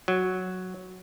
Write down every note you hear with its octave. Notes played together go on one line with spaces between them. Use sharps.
F#3